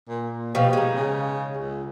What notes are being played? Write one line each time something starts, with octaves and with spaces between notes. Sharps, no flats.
A#2
B2 F3 G4
G#3 D#4
C#3
C#2